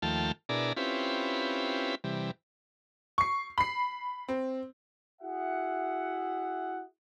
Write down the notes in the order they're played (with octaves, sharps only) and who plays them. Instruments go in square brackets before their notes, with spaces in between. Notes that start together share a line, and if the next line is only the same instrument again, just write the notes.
[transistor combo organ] D#2 F3 A3 G5 A5 F6
B2 D4 E4 G#4 A#4 D5
C4 C#4 E4 F4 G4 B4
C3 E3 G3
[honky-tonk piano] C#6 C7
B5 C7
C4
[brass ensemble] E4 F#4 G#4 E5 F#5